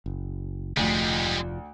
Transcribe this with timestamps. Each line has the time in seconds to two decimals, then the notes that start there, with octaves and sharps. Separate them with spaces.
0.06 F#1
0.77 F1 D2 F3 G3 G#3